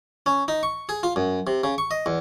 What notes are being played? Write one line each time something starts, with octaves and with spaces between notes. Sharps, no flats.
C#4
D#4
C#6
G#4
F4
F#2
C3
C#3
C#6
D#5
E2